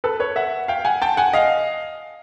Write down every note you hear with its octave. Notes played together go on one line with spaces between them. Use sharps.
A4 B4
B4 C#5
E5 F#5
F5 G5
F#5 G#5
G5 A5
F#5 G#5
D#5 F5